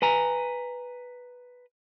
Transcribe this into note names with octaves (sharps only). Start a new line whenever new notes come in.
B4 G#5 A#5